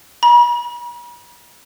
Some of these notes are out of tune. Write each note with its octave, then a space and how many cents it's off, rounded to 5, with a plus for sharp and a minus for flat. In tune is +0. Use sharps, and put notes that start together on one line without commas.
B5 -45